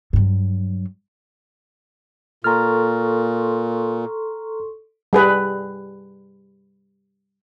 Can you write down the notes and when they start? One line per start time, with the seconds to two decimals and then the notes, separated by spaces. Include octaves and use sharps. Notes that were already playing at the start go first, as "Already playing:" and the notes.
0.13 G2 F#3
2.44 A#2 A4 A#5 C6 C#6 F6
5.13 G3 G#4 B4